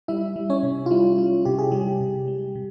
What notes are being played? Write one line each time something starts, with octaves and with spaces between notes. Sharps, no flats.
G3 E4 E5
G3
C#4 C#5
C3
F4
G3 E4
G3 F4
C3 G4
G#4
C3 G3 G4
C3
G#3
C3